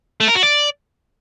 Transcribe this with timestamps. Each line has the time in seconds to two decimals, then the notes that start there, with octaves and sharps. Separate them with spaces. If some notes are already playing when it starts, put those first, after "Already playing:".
0.20 A3
0.28 A#4
0.35 F#4
0.43 D5